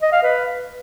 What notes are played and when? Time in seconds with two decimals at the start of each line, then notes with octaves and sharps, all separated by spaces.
0.02 D#5
0.13 F5
0.23 B4